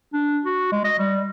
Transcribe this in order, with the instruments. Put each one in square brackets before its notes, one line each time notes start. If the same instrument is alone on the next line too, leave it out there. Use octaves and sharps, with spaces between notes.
[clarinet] D4
F#4
G#3
D#5
G3